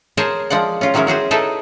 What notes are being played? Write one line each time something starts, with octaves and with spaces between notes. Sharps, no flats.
G#4 A#4 C5 C#5 G#5 A5
F3 G#3 D5 F#5
C#4 F4
D#3 F#3 G#3 C#4 E4
C#4 F#4 G#4 C5
D#4 E4 G#4 A4 B4 A5